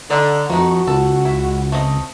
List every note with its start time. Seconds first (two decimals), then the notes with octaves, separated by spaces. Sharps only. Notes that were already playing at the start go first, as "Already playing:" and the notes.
0.10 D3 D#4 D5
0.50 F2 D#3 A3 D#4 F#4
0.87 C#2 A4
1.25 E4
1.72 A3 C4 D#5